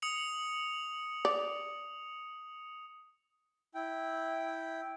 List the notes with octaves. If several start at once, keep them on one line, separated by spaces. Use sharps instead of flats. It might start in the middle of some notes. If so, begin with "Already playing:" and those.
D#6 C#7 F7
D5
E4 G5